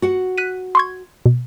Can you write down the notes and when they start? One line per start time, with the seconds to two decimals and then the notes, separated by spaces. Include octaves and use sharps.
0.02 F#4 F#5
0.38 F#6 B6 D#7
0.75 C6 C#6 G#6
1.26 B2